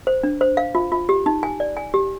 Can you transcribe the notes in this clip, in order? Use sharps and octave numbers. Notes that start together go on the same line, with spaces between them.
C5
D4
C5
F5
F4
F4
G4
D#4
G#5
D5
G#5
G4